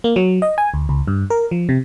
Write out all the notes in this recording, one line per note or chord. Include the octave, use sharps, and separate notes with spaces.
A#3
F#3
D#5
G#5
D2
C#2
G2
A#4
F3
C3